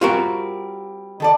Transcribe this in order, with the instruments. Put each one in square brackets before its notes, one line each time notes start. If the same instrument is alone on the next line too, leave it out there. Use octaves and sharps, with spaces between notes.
[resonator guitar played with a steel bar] G3 C4 [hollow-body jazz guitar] F4 F#4 A#4
[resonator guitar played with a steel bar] D#3 A4 D5